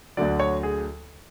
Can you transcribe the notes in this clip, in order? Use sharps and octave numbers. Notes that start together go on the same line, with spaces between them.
D2 D3 F#3 D5
C#5
G#4